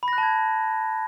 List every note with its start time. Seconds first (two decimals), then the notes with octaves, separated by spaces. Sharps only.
0.03 B5
0.08 A#6
0.13 F#6
0.18 A5
0.23 G#6